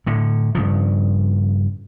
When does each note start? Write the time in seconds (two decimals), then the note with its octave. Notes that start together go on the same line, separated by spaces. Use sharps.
0.06 A2 D3
0.55 G2 C#3 F3